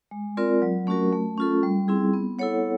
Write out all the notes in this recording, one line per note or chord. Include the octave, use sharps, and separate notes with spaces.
G#3
C4 F4 A#4 D5
F#3
A3 C#4 F#4 A#4
A3
C#4 F4 A4
G3
C4 E4 G#4
B3
E4 A4 C#5 F#5